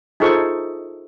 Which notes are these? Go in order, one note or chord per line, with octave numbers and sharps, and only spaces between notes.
D#4 F4 G#4 A4 C5 C#6